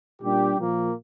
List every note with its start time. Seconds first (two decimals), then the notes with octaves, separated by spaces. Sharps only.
0.21 A#2 G3 D4 G4
0.58 A#2 F3 A#3